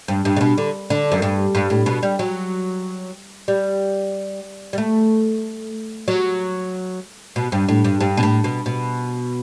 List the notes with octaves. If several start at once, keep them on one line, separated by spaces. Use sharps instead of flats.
G2
G2
C#3
B2
D3
D3
F#2
G2
G2
A2
B2
G3
F#3
G3
G3
A3
F#3
B2
G2
A2
G2
G2
B2
A2
B2
B2